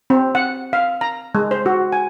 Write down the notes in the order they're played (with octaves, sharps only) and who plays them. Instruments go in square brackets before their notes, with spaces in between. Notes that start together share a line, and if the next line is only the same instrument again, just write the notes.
[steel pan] C4
F#5
F5
A#5
G#3
C5
F#4
G#5